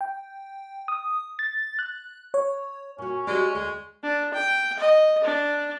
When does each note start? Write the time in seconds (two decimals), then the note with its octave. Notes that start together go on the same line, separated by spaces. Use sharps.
0.01 G5
0.88 D#6
1.39 A6
1.79 F#6
2.34 C#5
2.98 A#2 C#4 F#4
3.27 G#3 F#4 G4 D5
3.55 D2 G#3
4.03 D4
4.34 G5
4.79 D#5
5.24 D4